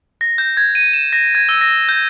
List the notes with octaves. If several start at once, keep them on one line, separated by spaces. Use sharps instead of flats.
A#6
G6
G#6
D#7
E7
A#6
G#6
E6
A#6
G6